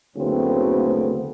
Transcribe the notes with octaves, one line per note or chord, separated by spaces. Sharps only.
F#1 D2 C#3 A3 B3 C4